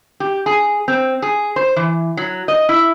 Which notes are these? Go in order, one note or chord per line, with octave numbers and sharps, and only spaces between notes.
G4
G#4
C4
G#4
C5
E3
F#3
D#5
E4